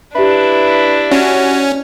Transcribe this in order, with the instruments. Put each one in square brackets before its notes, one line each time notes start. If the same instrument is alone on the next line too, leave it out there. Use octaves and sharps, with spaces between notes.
[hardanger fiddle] D4 E4 [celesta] G4 E5 [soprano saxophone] B4
[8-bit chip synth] C#4 [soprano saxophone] F#4